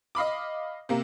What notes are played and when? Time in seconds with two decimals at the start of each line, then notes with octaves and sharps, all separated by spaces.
0.15 D#5 F5 B5 D6
0.89 C3 A#3